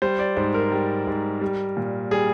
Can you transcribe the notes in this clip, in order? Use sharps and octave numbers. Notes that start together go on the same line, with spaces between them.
G3 C5
D5
G#2 C5
A#4
G3
G#2
G3
A#2
G3 G#4